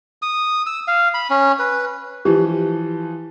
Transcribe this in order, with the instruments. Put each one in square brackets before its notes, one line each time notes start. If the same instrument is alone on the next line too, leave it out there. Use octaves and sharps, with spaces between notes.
[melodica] D#6
E6
F5
B5
C#4
B4
[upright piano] E3 F3 [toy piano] G4